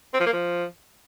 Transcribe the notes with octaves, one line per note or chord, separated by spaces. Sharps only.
C4
F3
A#3
F3